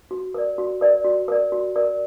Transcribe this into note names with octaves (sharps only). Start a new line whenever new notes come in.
F#4
A#4 D5
F#4
A#4 D5
F#4
A#4 D5
F#4
A#4 D5